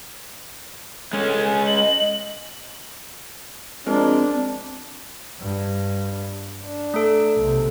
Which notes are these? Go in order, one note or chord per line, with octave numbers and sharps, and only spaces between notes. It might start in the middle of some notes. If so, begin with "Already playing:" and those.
G#3 C#4 A4
G#5
D#5 F#7
F3 G#3 C4 D4 A#4
G2
D4
A3 A4
B1 C3